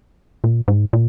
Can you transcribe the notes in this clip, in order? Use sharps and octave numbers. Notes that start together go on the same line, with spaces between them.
A#2
G#2
A#2